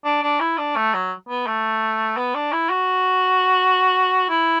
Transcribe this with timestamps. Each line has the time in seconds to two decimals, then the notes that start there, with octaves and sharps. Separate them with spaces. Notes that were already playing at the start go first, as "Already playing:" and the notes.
0.05 D4
0.23 D4
0.40 E4
0.58 D4
0.76 A3
0.94 F#3
1.29 B3
1.47 A3
2.17 B3
2.35 D4
2.52 E4
2.70 F#4
4.29 E4